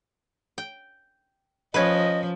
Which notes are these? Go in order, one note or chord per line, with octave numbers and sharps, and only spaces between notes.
G5
F3 C#4 B4 D#5